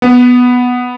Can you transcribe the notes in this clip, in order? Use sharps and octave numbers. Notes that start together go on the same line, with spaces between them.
B3